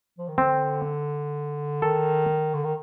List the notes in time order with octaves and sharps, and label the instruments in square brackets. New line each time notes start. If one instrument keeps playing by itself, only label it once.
[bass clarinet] F3
D#3
[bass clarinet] D3 [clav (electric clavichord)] C4
[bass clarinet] D#3 [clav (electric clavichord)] A4
[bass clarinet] D3
D#3